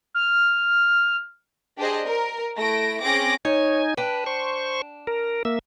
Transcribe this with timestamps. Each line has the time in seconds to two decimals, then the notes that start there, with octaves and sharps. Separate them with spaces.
0.14 F6
1.78 D4 G4 G#4 C5 D#5
2.07 A#4
2.58 A3 E4 A#6 D7
3.03 C4 C#4 G#4 D6 A#6
3.45 D#4 C#5 G#5
3.97 D4 B4 G5
4.26 C5 C#6
5.07 A#4
5.45 A#3 E5